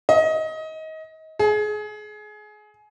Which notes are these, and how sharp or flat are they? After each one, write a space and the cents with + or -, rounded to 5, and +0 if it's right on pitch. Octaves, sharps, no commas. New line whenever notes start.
D#5 +25
G#4 +25